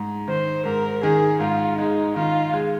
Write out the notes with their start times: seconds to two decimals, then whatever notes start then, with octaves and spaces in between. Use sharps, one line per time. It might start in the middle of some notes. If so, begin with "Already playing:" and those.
Already playing: G#2 G#3
0.28 D#3 C5
0.65 G#2 A#4
1.03 D#3 G#4
1.40 G#2 F4
1.78 G#3 D#4
2.16 D#3 F4
2.53 G#3